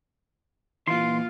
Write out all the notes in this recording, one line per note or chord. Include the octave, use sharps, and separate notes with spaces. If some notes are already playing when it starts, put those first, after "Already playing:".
A#2 E3 F4 C6